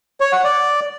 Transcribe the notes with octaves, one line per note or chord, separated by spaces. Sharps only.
C#5
F#5
D5